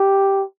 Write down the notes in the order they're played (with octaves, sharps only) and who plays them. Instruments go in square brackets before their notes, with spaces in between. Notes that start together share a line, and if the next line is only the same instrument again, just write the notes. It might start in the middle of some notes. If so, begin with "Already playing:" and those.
Already playing: [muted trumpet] G4